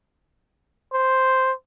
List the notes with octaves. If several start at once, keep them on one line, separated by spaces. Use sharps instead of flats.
C5